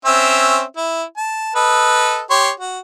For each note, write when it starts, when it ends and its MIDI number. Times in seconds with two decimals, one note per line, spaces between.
0.05 0.62 60
0.05 0.62 61
0.05 0.62 76
0.77 1.03 64
1.17 1.55 81
1.56 2.21 69
1.56 2.21 71
1.56 2.21 75
2.31 2.50 67
2.31 2.50 73
2.31 2.50 84
2.60 2.79 66